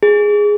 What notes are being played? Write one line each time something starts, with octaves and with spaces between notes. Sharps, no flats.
G#4